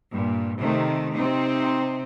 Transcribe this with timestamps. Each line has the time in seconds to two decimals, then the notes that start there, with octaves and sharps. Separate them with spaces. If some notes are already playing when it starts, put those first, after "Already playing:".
0.12 G2 A#2
0.60 C3 D#3 A3
1.15 C3 C4 D#4